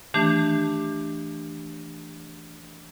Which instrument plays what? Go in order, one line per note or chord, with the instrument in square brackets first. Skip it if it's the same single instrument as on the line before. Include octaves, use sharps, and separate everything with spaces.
[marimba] D#3 E3 A3 D4 G4